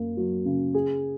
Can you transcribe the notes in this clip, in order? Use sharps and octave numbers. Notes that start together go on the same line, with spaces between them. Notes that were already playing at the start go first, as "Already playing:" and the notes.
Already playing: F#2 A#3
F#3
C#3
G#4